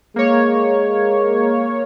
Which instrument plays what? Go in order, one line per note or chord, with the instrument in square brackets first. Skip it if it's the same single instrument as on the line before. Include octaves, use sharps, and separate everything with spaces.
[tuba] G#3 [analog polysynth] A#3 C#5